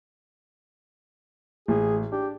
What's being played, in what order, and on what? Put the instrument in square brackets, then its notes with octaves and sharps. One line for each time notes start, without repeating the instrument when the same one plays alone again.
[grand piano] A1 [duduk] G#4
[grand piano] D4 [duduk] G4